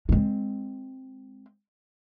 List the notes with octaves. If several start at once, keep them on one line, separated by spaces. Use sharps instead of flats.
G#3 C4